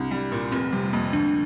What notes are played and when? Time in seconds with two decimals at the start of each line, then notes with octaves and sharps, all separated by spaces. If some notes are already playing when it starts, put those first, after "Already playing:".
Already playing: C2 C4 D4
0.11 G3
0.32 A#2
0.52 F1 C4
0.72 C3 G3
0.93 F2 A#3
1.13 D2 D4